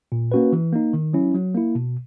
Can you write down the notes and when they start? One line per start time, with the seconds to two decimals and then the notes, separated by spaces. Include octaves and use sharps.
0.12 A#2
0.32 A#3 C#4 F#4 B4
0.52 E3
0.73 A#3 D#4
0.93 D#3
1.13 F#3 C#4 E4
1.34 F#3
1.54 A#3 E4
1.75 B2